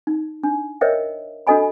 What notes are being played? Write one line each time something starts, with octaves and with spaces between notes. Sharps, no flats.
D#4
D4
A#4 C5 C#5 D#5 E5 G5
D4 F#4 A4 D#5 G#5 B5